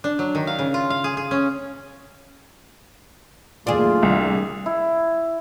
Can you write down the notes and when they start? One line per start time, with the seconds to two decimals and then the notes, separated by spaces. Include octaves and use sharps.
0.04 D4
0.19 F#3
0.35 D#3
0.47 F5
0.59 C#3
0.74 F4
0.90 F5
1.04 G#4
1.17 G#4
1.31 C#4
3.67 D#2 F#3 A3 D4 F4 G#4
4.03 C2 D#3
4.66 E4